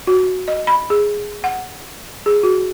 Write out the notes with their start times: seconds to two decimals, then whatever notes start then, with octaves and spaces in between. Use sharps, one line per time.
0.07 F#4
0.48 D#5
0.67 B5
0.90 G#4
1.44 F#5
2.26 G#4
2.43 F#4